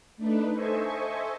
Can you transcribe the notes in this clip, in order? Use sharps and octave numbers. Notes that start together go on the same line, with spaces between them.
A3 D4 D#4 B4
A4 C5 D#5 E5 G#5 C#6